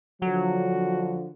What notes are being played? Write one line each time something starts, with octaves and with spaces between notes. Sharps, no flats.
D3 F3 F#3 F#4